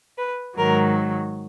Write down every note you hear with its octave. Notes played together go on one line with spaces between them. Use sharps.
B4
G#2 D#3 F#3 A#4